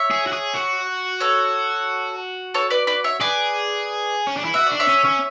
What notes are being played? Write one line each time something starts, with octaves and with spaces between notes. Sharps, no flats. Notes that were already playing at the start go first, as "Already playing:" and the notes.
Already playing: C#5 E5
G#4
F#4
G#4
F#4
A4 C#5
A4 C#5
B4 D5
B4 D5
C#5 E5
G#4 B4 D5
C#4
D4
E4
F#4 E5
D4 D5
C#5 E5
C#4
C#4